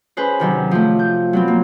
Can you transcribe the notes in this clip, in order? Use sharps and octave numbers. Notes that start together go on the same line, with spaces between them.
C#4 G#4 B4 C5
C3 D#3 F#3 C#4
F3 A3
G6
F#3 B3 C4
A#3